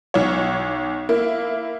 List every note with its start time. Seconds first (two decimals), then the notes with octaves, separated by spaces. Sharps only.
0.14 B1 C#5
1.09 A#3 E4